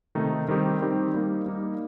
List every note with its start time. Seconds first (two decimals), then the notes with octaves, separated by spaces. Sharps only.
0.15 C3 D#3 A3 D#4
0.48 D#3 G3 C4 D#4 G4
0.81 D#3 G3 C4 D#4 G4
1.14 G3 A#3 D#4
1.46 G3 A#3 D#4